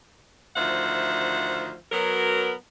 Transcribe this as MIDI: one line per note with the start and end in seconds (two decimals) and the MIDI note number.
0.56 1.73 38
0.56 1.73 51
0.56 1.73 53
0.56 1.73 72
0.56 1.73 76
0.56 1.73 78
1.91 2.52 54
1.91 2.52 59
1.91 2.52 70